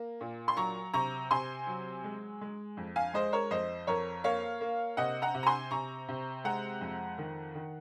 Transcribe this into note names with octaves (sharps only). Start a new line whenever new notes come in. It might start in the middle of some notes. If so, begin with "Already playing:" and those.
Already playing: A#3
A#2
C6
F#3 A#5 C#6
C3 A#5 C#6
C3 G#5 C6
F#3
G#3
G#3
F2
F5 G#5
G#3 C5 D#5
A#4 C#5
F2 C5 D#5
F2 A#4 C#5
A#3 C#5 F5
A#3
C3 D#5 F#5
F#5 A#5
C3
A#5
G#5 C6
C3 A#5 C#6
C3
G#3 F#5 A#5
F2
D#3
D#3